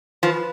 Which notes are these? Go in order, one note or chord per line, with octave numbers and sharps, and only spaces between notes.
F3 B4